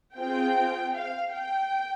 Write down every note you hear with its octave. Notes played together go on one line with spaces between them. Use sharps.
C4 F4 G#4 G5
F5
G5